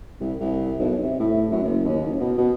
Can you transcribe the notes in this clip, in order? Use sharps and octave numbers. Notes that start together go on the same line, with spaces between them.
C2
C2
B1
C3
A2
F#2
F#1
D#2
F#1
B2
B2